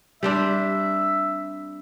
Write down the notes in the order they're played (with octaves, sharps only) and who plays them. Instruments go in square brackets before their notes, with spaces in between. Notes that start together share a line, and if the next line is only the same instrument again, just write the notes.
[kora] G3 C4 D4 [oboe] E5